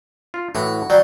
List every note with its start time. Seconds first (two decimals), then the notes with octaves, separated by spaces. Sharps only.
0.34 F4
0.55 A2 E3 F#4
0.90 F#3 G3